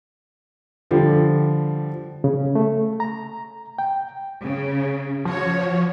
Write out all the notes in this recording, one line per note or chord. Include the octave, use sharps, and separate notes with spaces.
D3 F3 G3
C#3
A3
A#5
G5
C#3
F3 F#4 C#5